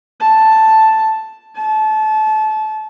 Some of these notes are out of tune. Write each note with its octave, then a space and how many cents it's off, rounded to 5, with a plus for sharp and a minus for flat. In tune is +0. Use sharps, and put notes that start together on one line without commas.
A5 +0
A5 -25